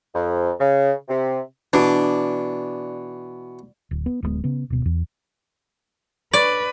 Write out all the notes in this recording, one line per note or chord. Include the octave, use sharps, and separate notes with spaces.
F2
C#3
C3
B2 E3 D4
D1
B3
D1 G2 G#3 B3
C#3 B3
D1 B2
E2
B4 D5